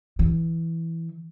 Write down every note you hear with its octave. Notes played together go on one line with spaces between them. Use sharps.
E3